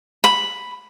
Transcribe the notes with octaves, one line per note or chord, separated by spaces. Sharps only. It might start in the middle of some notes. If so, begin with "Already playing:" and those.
B5